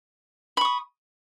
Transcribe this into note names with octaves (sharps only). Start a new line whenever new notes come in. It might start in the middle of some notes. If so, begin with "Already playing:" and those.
B5 C#6 D#6